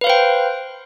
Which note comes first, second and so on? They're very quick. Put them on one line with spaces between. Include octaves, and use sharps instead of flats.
B4 F5 C5 G5